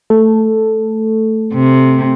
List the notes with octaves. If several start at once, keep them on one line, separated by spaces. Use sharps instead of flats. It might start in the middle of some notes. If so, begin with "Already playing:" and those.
A3 A4
C3